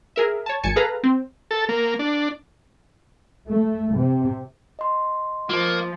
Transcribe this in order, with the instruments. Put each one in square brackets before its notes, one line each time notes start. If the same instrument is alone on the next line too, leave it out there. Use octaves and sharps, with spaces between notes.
[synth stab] G#4 A#4 E5
C#5 A5
G#1 G#5 A5 C#7
G#4 A4 B4 F5 A#5
C4
[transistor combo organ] A4
A#3
D4
[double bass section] A3
C3
[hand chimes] D#5 C6
[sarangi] F3 [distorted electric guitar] A#3 [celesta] F4